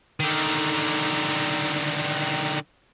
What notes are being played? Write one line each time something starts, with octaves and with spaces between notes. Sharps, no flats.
D3 D#3